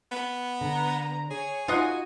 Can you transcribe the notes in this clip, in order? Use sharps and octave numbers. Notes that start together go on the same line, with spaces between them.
B3
D3 A#5
G#4 C#5
D#4 F4 F#4 D#5 F#5 G#5